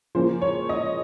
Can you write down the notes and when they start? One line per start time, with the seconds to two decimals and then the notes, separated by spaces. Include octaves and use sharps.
0.15 C#3 F3 A#3 C#4 C5
0.42 C#5
0.69 D#5